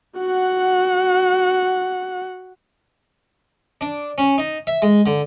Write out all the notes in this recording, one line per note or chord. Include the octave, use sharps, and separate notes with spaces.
F#4 F#5
D4
C#4
D#4
E5
G#3
D3